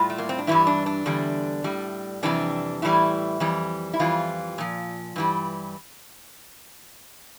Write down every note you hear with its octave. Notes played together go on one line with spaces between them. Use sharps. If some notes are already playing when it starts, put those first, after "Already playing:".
Already playing: A2 G3 F4
A3
A#3
C4
D4
G2 E3 G3 E4
D4
D4
E2 D3 G3
A2 G3
F2 C3 E3 G3 D4
A2 E3 G3 E4
F2 E3 G3
E4
F2 E3 G3 F4
A#2 F3
G2 E3 G3